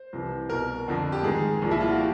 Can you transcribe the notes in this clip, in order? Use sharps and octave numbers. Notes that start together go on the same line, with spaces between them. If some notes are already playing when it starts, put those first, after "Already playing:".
Already playing: C5
C2 C3 E3
C2 B2 A#4
F2 D3 F3
G4
G#2 D#3 G#4
C2 A#2 F3
E4
F4
F#4
F3 G4